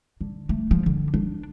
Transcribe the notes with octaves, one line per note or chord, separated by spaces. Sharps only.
D3
A3
F3
D3
D4